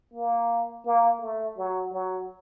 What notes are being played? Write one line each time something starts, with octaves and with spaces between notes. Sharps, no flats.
A#3
A#3
A3
F#3
F#3